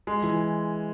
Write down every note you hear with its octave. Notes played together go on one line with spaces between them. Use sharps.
G#3
E3